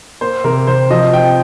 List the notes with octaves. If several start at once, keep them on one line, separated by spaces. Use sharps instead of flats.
A#3 C5
C3 A#4
C3 C5
F3 D#5
C4 G5